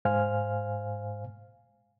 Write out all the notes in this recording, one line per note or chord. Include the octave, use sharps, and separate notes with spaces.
G#2 C5 F5 G#5 F6